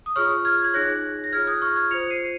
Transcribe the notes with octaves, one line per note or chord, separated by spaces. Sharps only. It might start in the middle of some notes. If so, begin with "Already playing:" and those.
D#6
F4 G#4 C#5 C#6 F6
F6 G#6
G#6
D#4 G#4 C#5 F#6 A#6
A#6
F4 G#4 C#5 F6 G#6
D#6 F#6
C#6 F6
F6 G#6
F4 C5 C#7 F7
C7 D#7